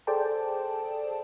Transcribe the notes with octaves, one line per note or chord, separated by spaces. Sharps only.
G#4 A4 C5 D5 G5 A5